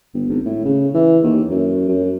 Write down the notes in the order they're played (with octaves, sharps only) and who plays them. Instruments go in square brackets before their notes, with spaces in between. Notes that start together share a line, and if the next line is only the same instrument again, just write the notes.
[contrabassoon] G1
G#1
A2
C#3
E3
D#2
F#2
F#2